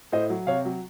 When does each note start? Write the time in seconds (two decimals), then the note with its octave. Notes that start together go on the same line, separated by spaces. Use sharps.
0.12 A2 C5 D#5
0.30 F#3
0.47 C3 C#5 F5
0.65 F#3